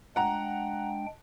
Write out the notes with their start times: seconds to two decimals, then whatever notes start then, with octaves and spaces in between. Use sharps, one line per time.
0.16 G#3 D4 F#5 G5 A#5